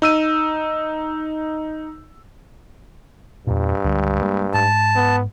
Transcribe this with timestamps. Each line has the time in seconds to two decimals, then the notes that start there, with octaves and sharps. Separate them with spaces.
0.02 D#4 E6 D#7
3.47 E2 G2 A#2
3.84 C#2 D3 G3
4.22 G3 G#3 A#3
4.54 G#2 A5
4.96 B3